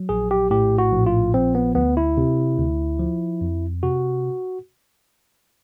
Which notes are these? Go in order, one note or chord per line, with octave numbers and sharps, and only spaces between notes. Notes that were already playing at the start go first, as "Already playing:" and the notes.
Already playing: F#3
A#1 G#4
G4
A2 G4
F#4
A#1
F4
F3 C4
B3
D2 B3
E4
C3
D2
F3
F2
C3 F#4